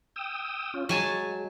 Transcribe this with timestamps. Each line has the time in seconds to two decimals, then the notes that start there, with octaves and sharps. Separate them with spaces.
0.16 G5 D#6 E6
0.74 C#4 F4
0.89 F#3 G#3 G#5 A5